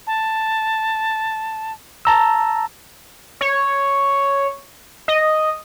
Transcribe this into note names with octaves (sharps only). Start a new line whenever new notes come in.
A5
A5 A#5 E6
C#5
D#5